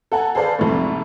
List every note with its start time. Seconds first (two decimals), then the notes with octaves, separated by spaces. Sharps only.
0.12 A4 F#5 G#5 A#5
0.35 G#4 A4 B4 C5 D5 F5
0.59 A#1 F2 G#2 C3 A3